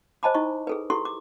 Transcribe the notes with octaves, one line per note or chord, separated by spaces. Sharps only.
C5 D#5 G#5 A5 B5 D6
D#4 E4 D#5 C#6
G#4 A4 B4
E4 G4 A4 C6 C#6
D6